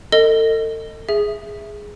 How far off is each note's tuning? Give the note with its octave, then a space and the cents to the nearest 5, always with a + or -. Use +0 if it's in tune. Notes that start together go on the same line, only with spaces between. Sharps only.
A4 +40 D#5 +0
G#4 +0 E5 +0